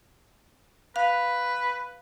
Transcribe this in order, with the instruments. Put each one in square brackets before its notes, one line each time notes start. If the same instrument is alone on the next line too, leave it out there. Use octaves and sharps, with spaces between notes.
[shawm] B4 [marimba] F5